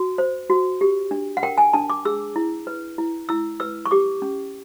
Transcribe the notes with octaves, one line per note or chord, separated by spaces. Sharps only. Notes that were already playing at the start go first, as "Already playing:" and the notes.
Already playing: F#4
C5
F#4
G4
D4
F#5
A#4 G5
G#5
D4 A5
D6
G#4 E6
E4
B4
E4
E4 E6
B4 E6
C#6
G4 D6
C#4